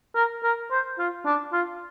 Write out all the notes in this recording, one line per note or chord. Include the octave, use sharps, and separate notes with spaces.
A#4
A#4
C5
F4
D4
F4